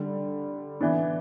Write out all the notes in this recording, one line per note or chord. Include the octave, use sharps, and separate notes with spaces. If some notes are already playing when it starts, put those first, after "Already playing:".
Already playing: D3 G3 D4
E3 B3 D4